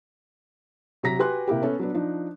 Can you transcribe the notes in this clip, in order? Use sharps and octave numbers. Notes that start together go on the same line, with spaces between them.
C3 F#3 F#4 A#5 A#6 B6
F#4 G4 B4 G#5 C6 F#6
C3 A#3 E4 G4
B3 C#4 A4
F#3 B3 D4
F3 D4 D#4